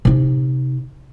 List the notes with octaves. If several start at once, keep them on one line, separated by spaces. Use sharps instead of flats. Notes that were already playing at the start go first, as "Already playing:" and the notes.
C3 D#4